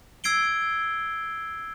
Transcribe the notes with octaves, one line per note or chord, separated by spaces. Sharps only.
E6 G#6 C7 D7 G7